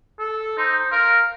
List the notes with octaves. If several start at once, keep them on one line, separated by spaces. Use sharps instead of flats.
A4
D#4 C5
A#4 F5